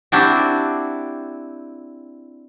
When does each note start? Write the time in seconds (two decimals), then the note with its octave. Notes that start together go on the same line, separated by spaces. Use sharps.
0.12 C4 D4 E4 F#4 G4